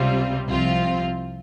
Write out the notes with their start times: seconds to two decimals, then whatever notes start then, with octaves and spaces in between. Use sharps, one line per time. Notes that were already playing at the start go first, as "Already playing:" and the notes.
Already playing: C#2 C3 G3 C4 F4
0.46 C2 C3 F3 C4 F4